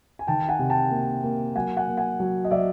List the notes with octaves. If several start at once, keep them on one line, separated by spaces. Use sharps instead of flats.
G#5
D#3 G5 A5
F#5 G#5
C3
G5 A5
A#3
A#3
F#3 F#5 G#5
F#5 G#5
A#3
F#5 G#5
F#3
D#5
F#3 D5 E5